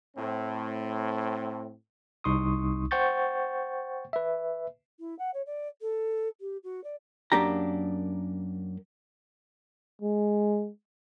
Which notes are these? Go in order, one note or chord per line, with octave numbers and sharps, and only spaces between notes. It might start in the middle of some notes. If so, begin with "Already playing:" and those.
A2 C4
C2 D#4 C6 C#6 D#6
C5 F#5 G5 C#6 G6 A6
B4 E5
E4
F#5
C#5
D5
A4
G4
F#4
D5
F#2 A#3 D4 G4 A#5
G#3